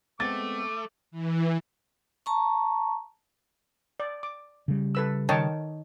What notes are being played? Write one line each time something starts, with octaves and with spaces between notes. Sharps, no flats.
G#3 A3 B3 C4 D6 A6
E3
A5 A#5 C#6
D5
D6
C#3 G3
A4 B4 E6
D#3 C#5 G5 A5